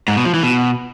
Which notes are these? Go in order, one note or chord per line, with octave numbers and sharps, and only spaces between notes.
G#2
B2
F3
E3
B2